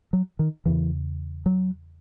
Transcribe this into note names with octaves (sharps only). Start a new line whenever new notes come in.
F#3
D#3
E2 C#3 E3
F#3